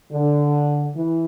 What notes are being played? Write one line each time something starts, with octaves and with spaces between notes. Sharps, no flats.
D3
E3